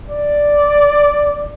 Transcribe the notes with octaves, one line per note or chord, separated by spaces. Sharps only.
D5